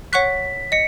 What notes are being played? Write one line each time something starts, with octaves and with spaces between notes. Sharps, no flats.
C#5 F#5 C#6 F#6 B6
D#5 C#7